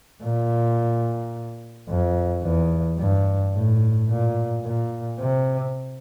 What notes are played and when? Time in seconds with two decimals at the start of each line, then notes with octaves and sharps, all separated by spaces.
0.22 A#2
1.89 F2
2.44 E2
2.98 G2
3.54 A2
4.09 A#2
4.65 A#2
5.19 C3